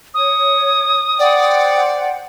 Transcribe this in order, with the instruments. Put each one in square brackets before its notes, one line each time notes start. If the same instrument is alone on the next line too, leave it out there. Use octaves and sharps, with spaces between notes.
[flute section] C#5 [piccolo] D#6
[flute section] C5 F#5 G5 [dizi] D5